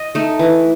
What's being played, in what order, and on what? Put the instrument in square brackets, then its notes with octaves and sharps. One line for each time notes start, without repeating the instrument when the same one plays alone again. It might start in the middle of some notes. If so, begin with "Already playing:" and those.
Already playing: [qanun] D#5
A3 D#4
E3